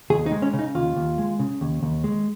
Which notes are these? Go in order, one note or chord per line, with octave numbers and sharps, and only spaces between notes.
D#2 G#4
D#4
G#3
C#4
C#3
D#4
D#2 F4
D#2
G#3
C#3
D#2
D#2
G#3